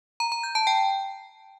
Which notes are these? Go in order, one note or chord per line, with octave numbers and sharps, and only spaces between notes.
A#5
A#5
G6
A5
G5